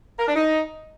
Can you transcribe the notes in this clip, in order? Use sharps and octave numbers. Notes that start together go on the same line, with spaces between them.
A#4
D4
D#4